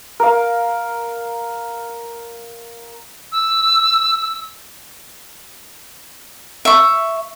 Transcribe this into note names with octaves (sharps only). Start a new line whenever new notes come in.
A#4 F5
E6
E5 C#6